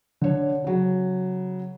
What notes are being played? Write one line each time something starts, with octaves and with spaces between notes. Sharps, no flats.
D3 C#5
C#3 F#3